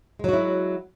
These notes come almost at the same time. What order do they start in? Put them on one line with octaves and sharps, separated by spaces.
G#3 F#3 F#4 E4